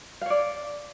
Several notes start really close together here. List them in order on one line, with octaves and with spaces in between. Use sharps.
F5 C#5 D5